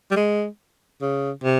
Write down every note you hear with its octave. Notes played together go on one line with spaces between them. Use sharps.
G3
G#3
C#3
C3